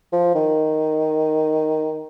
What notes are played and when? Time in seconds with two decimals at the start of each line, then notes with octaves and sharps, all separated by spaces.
0.12 F3
0.35 D#3